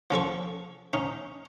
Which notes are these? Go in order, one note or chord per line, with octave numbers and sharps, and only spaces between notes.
F3 C#4 A4 C#6
C#4 D#4